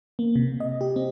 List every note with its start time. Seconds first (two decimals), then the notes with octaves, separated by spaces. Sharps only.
0.19 A#3
0.35 C3
0.60 D#5
0.81 G4
0.96 C4